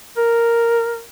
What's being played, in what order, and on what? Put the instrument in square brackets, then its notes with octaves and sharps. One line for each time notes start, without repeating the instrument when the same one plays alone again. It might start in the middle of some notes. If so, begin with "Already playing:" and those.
[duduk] A#4